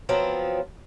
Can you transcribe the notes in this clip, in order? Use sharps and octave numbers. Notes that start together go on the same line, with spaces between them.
F3 F#3 B3 C4